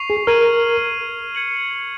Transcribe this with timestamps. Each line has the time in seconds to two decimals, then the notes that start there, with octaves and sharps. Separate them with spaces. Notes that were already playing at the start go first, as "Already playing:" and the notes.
Already playing: C#6 C7 F7
0.10 G#4
0.27 A#4 F6 G#6 D#7 F#7
1.35 G#6 C#7 F#7